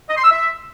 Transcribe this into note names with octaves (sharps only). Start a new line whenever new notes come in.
D#5
C6
E6
E5